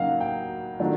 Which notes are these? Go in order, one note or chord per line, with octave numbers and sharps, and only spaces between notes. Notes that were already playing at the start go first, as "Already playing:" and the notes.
Already playing: C#3 F#3 A#3 D#4 F5 F#5
G5
D#3 F#3 A3 D4 F4